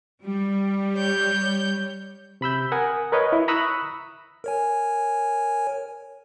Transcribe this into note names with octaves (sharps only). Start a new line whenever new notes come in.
G3
C#5 G6
C3 B5 E6 G6
A#4 F#5 G#5 D#6
A#4 B4 C#5 D#5
E4
A#5 B5 C#6 D#6 E6 F#6
A#4 C#5 G#5